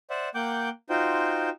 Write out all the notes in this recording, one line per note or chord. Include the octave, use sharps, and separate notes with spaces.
C5 D5 E5 F#5
A#3 F#5 G5 D6 G6
D#4 F4 F#4 C5 G5